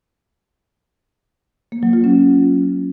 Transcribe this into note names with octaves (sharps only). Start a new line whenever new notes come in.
A#3
F#3
F4
C#4